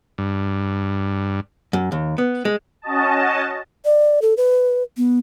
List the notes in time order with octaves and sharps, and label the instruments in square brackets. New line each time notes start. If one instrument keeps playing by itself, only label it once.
[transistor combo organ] G2
[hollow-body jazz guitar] F#2
D#2
B3
G#3
[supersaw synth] C#4 F#4 D#5 A5
[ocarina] D5
A4
B4
B3